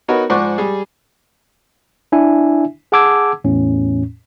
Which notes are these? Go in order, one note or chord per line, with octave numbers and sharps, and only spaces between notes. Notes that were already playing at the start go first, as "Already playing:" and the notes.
B3 D#4 F#4 A#4 B4 C#5
G#2 F3 C5 D5 F#5 C#6
G3 G#4
D4 E4 E5 G#5
G#4 F#5 A5 D6 E6 G#6
E2 A2 C#4